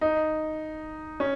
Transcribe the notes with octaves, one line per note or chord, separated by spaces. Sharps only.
D#4
C#4